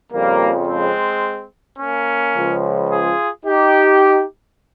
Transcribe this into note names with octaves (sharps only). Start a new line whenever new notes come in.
F2 C#3 F3 G3 A#3
G#3 C4
A#3 C#4
C#2 C#3 F3
F4 G#4
D#4 G4